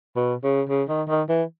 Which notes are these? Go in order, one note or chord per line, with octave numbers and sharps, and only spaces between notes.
B2
C#3
C#3
D#3
D#3
E3